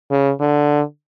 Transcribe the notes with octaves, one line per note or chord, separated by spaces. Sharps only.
C#3
D3